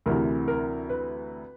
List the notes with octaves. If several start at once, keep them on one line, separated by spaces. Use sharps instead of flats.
D2 C3 E3 A#4
A#4
B4